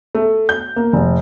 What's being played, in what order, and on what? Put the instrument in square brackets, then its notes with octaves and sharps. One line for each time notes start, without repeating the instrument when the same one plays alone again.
[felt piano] A3
G6
A#3
F1